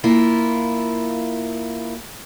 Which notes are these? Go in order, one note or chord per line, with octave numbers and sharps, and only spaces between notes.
A#3 E4 F4